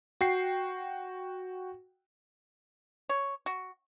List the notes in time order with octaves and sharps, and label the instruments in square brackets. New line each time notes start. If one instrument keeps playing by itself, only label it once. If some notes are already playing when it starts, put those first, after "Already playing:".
[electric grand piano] F#4 G5 C7
[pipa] C#5
F#4